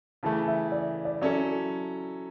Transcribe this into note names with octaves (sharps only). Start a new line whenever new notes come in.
C#3 E3 A3 A5
E5
D5
D5
F#3 C#4 E4 A4 D5